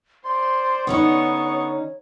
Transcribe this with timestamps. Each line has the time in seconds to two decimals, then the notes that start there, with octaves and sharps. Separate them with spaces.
0.24 C5 D5 C6
0.87 D3 B3 C#4 D#4 C#5 C#6 D#6